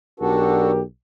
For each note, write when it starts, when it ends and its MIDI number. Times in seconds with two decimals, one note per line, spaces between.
0.20 0.81 35
0.20 0.72 62
0.20 0.72 66
0.20 0.81 67
0.20 0.72 69
0.20 0.81 70